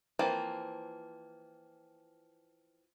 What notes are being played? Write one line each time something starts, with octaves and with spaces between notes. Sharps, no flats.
E3 F3 A#3 C4